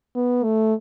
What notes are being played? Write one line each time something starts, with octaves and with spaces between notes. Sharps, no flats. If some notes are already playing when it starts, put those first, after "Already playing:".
B3
A3